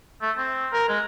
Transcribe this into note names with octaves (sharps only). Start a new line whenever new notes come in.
A3
C4
A#4
G#3